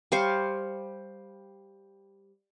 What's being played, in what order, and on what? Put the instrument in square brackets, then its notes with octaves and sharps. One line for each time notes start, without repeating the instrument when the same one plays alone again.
[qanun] G3 C5 F5 C#6